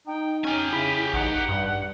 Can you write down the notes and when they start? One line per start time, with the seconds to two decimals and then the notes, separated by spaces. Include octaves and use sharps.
0.07 D#4 G5
0.45 C#4 G4 G#5 F6
0.73 C#3 E4 B6
1.13 A1 D#4 F#5
1.49 G2 G3